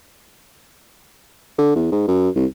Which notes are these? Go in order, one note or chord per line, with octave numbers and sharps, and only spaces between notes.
D3
E2
G#2
F#2
C2